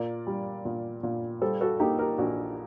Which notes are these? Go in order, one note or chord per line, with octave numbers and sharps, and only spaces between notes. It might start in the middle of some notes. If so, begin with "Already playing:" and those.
Already playing: A#2 A#4 D5
G3
A#2
A#2
G3 A4 C5
F#4 A4
A#3 D#4 G4
G4 A#4
A#1 F#4